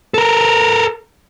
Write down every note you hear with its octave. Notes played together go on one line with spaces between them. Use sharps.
A4 A#4